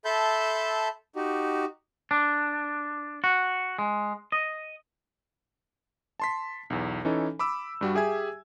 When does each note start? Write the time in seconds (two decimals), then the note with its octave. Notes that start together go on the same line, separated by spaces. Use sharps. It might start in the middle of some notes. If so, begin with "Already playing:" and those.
0.05 A4 E5 A5 B5 C6 G6
1.16 D#4 F#4 G4
2.11 D4
3.24 F#4
3.79 G#3
4.32 D#5
6.20 A5 C6 B6
6.70 B1 E2
7.05 E3 C#4 D#4 A4
7.39 B5 D6 E6
7.81 G2 G3 F#4
7.95 G4 G#4 E5 G#5 G#6